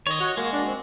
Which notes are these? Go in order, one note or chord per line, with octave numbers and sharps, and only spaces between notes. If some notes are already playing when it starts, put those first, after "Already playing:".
D#3 C#5 D#5
F#4
G#3 A#3 F#4
D4
C4